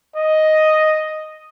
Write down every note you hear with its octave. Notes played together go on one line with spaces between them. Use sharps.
D#5